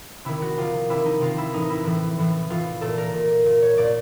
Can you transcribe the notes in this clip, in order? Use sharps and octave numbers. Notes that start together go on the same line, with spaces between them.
C3 D#3 E4
F#4
C3 D#3 F4
C3 D#3 E4
D#4
C3 D#3 F4
E4
A2 E3 D#4
E4
A2 E3 E4
A2 E3
A2 E3 F4
A#2 A4
A#4
A#2
A#2
C#5
A#2 D5